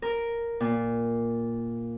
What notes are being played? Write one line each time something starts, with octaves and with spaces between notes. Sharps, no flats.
A#4
A#2